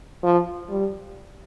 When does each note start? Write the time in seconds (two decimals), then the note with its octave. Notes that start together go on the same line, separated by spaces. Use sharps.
0.23 F3
0.70 G3